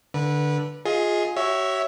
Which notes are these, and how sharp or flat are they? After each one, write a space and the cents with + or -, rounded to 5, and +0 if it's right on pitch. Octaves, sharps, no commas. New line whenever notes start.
D3 +5 B4 -20
F4 +20 G#4 +0 D#5 +30
F#4 +40 C#5 +0 E5 +0